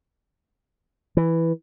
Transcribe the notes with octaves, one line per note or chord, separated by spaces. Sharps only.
E3